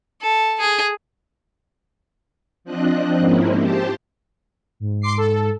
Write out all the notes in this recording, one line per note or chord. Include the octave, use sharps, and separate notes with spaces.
A4
G#4
F3 C4 D4 D#5 F#6
G#2 F3 A#3 C4 C#4 E4
G4 C5 A5
G#2
C6 D6 C7
A4